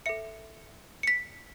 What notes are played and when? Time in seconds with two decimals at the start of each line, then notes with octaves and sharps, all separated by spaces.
0.06 A4 E5 C#7
1.03 C#7
1.07 B6